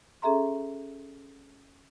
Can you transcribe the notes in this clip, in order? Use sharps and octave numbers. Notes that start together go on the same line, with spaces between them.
C#4 G#4 A4 E5 A#5 C6